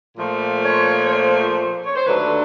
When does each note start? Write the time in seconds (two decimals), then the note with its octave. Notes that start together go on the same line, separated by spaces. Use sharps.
0.17 A#2 F3 A3
0.64 C#5
1.06 C#5
1.12 C5
1.86 C#5
1.96 C5
2.05 D#2 D3 F#3 A3 D4 B4